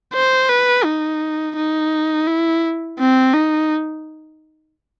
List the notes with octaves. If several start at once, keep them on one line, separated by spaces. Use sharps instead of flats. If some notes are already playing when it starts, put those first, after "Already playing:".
C5
B4
D#4
D#4
E4
C4
D#4